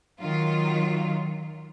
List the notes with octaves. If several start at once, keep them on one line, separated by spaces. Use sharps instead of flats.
D#3 F#3 F4